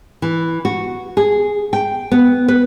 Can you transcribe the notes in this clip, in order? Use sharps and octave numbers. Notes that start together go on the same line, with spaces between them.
E3
F#4
G#4
G5
B3
B4